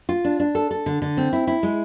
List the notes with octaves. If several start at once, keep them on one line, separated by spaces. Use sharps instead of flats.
F4
D4
D4
A4
A4
D3
D3
C4
E4
E4
G#3